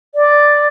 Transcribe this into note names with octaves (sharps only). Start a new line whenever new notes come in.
D5